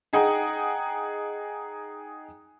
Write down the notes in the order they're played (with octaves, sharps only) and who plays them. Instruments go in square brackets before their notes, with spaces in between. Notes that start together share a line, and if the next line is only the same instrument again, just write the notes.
[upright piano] D#4 G#4 F#5 G5 A#5